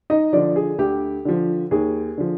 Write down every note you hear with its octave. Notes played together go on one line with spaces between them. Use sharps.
D#4 D#5
D3 F3 D4 D5
G#4
D2 G4
D3 F3
D#2 G#4
D3 F3